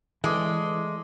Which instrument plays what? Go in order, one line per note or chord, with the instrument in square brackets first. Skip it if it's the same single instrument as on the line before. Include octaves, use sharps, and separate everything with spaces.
[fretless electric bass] E3 [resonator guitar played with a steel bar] G#3 [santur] A3 C#5 D5